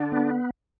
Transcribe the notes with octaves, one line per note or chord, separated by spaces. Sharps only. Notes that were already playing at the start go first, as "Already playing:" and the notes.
Already playing: D3 D4
B3